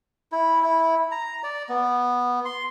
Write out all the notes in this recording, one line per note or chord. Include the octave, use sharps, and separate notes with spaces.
E4
E4
A#5
D5
B3
C6